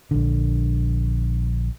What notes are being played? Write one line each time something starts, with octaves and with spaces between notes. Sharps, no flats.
A#1 D3